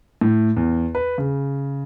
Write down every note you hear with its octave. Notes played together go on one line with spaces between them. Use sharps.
A2
E2
B4
C#3